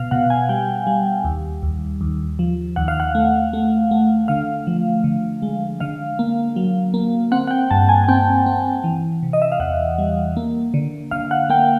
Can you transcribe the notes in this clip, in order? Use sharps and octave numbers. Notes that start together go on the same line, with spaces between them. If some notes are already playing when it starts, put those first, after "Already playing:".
Already playing: B2 F5
B2 F#5
G#5
G3 G5
G3
D#2
D#2
D#2
F3
D#2 F#5
F5
F#5
A3
A3
A3
D3 F5
F3
D3
G#3
D3 F5
A#3
F#3
A#3
C4 F#5
F#5
G5
G2 A5
G#5
G#5
C4 G5
C4
E3
C3
D#5
E5
F5
E2 F#5
G3
A#3
D3
D3 F5
F#5
A#3 G5